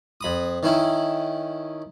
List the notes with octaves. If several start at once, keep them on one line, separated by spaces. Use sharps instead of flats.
F2 B5 D#6
D#3 C#4 E4